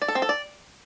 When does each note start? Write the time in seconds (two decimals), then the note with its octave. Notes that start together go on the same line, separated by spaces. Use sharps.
0.02 D5
0.08 A4
0.15 C4
0.22 A4
0.29 D5